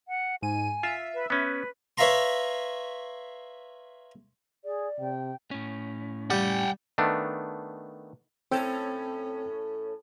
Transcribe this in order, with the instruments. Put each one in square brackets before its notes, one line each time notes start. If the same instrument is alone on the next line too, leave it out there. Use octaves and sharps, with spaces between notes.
[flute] F#5
[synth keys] G#2 D#7 [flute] G#5
[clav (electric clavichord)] F4 [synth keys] E5
[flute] B4
[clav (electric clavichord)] B3 C#4 [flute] B4
[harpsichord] B4 C#5 E5 F5 A#5 C6
[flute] G#4 [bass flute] D5
[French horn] C3 [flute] G5
[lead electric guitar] A2 C#4
[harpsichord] G3 [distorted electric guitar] F#5 G5
[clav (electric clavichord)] D#3 A3 B3 D4
[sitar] A2 C#4 A4 [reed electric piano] C4 G5